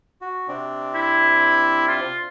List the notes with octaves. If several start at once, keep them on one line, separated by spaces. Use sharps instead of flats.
F#4
C3 C4 D4
E4
F4